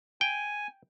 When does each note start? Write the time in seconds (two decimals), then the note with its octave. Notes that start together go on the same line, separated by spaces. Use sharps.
0.21 G5 G#5